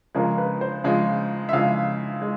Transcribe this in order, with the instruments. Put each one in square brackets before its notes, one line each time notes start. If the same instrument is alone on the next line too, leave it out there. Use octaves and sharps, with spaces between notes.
[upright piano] C#3 F3 G#3 A#4
B4
C5
C#3 F3 G#3
E5
C#3 F3 G#3 F5
G#3